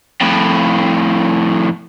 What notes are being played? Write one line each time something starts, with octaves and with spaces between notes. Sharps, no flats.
F2 A2